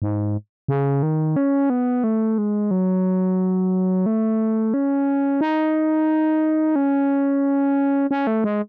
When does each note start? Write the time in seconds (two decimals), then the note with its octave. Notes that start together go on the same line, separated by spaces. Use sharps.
0.02 G#2
0.68 C#3
1.03 D#3
1.36 C#4
1.70 B3
2.04 A3
2.38 G#3
2.71 F#3
4.06 A3
4.74 C#4
5.41 D#4
6.76 C#4
8.11 C#4
8.27 A3
8.44 G#3